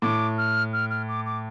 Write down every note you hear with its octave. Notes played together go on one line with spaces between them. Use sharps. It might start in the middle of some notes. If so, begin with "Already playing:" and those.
A2 D6
F6
F6
F6
D6
D6